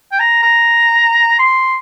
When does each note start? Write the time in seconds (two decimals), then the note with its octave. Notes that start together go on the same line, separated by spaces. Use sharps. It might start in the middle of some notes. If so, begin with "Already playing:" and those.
0.11 G5
0.19 A#5
0.42 A#5
1.39 C6